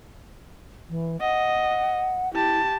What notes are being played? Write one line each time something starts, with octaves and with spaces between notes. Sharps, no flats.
E3
D#5 F#5
E4 G4 A5